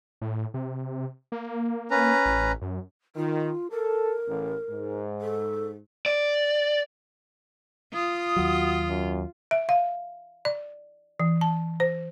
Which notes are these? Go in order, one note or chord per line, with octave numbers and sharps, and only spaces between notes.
A2
C3
A#3
C#4 B4 A#5
A1
F#2
D#3 F4
A4 A#4
A1
G#2
A4
D5
F4 D#6
D#2 F#3 F#4
F#2
E5
F5
D5
E3
A5
C5